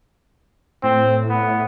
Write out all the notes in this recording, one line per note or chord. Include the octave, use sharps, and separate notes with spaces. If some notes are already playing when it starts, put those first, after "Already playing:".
A2 C4
B3